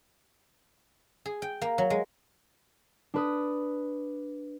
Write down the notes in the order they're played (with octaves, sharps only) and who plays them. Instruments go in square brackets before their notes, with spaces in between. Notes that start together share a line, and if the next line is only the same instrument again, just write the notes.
[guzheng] G#4
G5
A#3
F#3
G#3
[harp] D4 B4 D#6